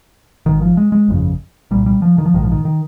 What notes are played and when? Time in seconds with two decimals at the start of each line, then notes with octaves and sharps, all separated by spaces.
0.46 G#1 G#2 D#3
0.62 F3
0.77 G#3
0.92 G#3
1.08 G1 F2 C#3
1.71 C2 A#2 G3
1.86 G3
2.02 F3
2.18 D#3
2.26 F3
2.34 A#1 G#2 D#3
2.44 F3
2.52 D#3
2.65 D#3